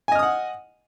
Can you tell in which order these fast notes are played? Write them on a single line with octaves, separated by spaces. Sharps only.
G#5 D#5 F6 D#6 F#5